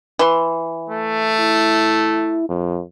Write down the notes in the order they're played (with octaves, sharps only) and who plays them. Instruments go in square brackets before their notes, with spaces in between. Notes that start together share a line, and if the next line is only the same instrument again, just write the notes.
[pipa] E3 C6
[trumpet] A3
[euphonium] E4
F2